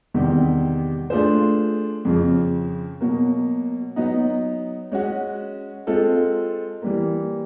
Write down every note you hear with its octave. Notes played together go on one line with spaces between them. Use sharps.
E2 C3 D#3 G3
A3 D4 F4 G#4 C5
F2 C#3 F3
B2 F#3 A#3
F#3 B3 D#4
G#3 C#4 F#4
G#3 C4 F4 A4
E3 G3 A#3